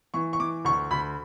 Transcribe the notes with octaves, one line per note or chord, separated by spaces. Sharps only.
E3 C#6
C#6
E3 D6
D2 C#6
D2 B5